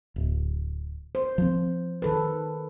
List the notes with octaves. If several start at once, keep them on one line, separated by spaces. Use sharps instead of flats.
D1
C5
F3 C4
D#3 A4 B4